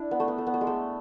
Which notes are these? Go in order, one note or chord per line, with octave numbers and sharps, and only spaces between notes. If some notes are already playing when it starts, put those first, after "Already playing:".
Already playing: D4 E4
B3
A3
B3
A3
B3
A3
G#3
A3